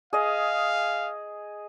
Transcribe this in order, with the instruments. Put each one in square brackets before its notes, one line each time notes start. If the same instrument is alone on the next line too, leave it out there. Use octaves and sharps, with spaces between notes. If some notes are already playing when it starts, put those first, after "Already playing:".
[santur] G#4 D#5 [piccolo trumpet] F5